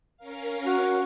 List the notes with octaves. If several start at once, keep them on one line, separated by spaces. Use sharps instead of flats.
C#4 A#4 F5
F#4